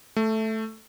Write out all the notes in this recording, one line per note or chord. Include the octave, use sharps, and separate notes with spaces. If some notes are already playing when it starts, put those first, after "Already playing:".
A3